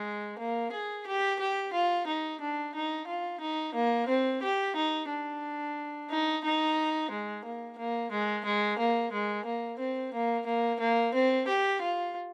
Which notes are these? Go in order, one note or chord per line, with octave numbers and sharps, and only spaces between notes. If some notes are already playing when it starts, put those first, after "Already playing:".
Already playing: G#3
A#3
G#4
G4
G4
F4
D#4
D4
D#4
F4
D#4
A#3
C4
G4
D#4
D4
D#4
D#4
G#3
A#3
A#3
G#3
G#3
A#3
G#3
A#3
C4
A#3
A#3
A#3
C4
G4
F4